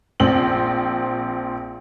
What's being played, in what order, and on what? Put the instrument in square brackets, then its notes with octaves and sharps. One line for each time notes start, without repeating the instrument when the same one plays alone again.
[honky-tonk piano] A#1 C4 F#7